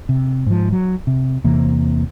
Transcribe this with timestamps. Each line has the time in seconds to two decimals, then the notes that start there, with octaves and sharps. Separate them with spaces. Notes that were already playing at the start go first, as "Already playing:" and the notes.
0.09 C3
0.46 G#2 F3
0.72 F#3
1.07 C3
1.44 E2 C3 E3 A#3